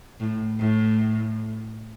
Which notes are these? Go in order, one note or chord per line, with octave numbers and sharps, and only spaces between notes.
A2
A2